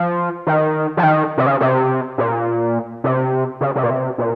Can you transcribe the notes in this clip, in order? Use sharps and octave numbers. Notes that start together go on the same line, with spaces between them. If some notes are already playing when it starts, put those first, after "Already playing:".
Already playing: F3
D#3
F3
D#3
C3
C#3
C3
A#2
C3
C#3
C3
A#2
C3
A#2